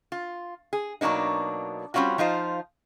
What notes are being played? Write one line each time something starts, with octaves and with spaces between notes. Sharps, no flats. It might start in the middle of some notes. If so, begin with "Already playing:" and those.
F4
G#4
B2 F#3 A#3 D4 D#4
G3 C4 C#4 F4 F#4
F3 D#4 F4 C5